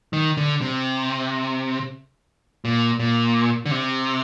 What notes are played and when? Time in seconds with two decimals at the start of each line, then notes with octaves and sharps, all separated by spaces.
0.13 D#3
0.37 D3
0.61 C3
2.65 A#2
2.99 A#2
3.66 D3
3.71 C3